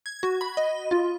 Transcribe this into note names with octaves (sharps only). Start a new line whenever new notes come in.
G#6
F#4
B5
D#5
F4